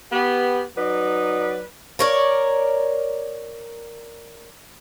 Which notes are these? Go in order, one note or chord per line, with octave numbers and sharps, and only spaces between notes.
B3 G4
F#3 D#4 B4 D5
A#4 C#5 D5